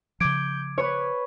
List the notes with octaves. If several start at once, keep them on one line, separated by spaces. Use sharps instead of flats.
C#3 F3 D6 G6 G#6 D7
B4 C#5 C#6